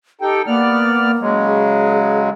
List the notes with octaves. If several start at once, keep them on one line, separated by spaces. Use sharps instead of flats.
D#4 G4 A4 G5
A#3 B3 D5 F6
C#3 F#3 G#3
G#4